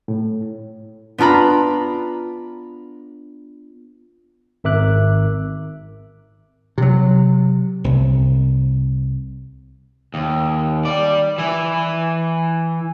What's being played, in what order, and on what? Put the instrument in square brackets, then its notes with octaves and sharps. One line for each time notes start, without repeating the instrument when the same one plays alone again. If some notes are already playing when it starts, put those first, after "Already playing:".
[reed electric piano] A2
[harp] B3 D4 F4 A#5 B5
[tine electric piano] G#1 A#4 E5 D6 F#6
[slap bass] C3 F#3
C2
[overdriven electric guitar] D#2
G3 D5
E3 E4